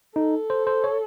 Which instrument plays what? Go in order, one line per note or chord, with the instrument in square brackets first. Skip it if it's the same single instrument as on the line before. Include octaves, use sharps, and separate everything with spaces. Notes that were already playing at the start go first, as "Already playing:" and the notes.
[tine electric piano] D#4 [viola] A4
[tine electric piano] C5
C5
C#5